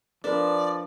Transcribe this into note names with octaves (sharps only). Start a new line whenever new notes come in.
F3 D4 A#4 B4 D5